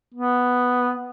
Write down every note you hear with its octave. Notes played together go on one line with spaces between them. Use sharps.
B3